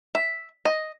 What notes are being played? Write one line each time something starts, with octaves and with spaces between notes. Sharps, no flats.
E5
D#5